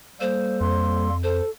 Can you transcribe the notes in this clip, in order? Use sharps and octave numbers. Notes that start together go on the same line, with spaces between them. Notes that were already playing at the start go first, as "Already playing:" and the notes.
G3 A#3 A4 C5
F2 C6
A4 C5